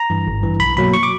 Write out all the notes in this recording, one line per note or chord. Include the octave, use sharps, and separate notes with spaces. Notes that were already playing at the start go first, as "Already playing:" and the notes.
Already playing: A#5
G2 E3
G#1
G2 E3
B1 B5
B2 F#3 A#3 B5
C#6
D6